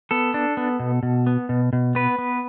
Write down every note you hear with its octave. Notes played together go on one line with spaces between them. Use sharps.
B3 A4
D4
B3
B2
B2
B3
B2
B2
B3 B4
B3